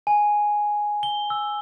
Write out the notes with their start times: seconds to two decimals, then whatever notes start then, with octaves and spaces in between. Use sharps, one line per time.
0.07 G#5
1.03 G7
1.30 E6